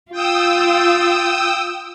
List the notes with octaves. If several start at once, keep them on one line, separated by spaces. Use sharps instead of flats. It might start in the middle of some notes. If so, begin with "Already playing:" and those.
F4 G5 D#6 E6